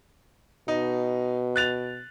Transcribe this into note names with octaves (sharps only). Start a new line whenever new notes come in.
B2 D#4
F#6 A6 F7